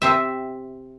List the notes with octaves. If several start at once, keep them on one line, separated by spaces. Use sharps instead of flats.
C3 C4 E5